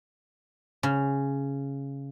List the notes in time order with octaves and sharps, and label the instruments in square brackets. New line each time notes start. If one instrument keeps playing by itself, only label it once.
[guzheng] C#3